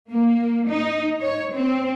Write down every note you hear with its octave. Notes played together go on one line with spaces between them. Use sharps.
A#3
D#4
C#5
C4